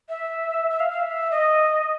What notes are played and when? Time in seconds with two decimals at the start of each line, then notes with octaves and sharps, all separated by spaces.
0.09 E5
0.70 E5
0.80 F5
0.90 F5
1.00 E5
1.31 D#5